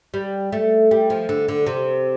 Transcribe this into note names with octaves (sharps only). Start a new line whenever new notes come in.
G3
A3
G3
F3
D3
D3
C3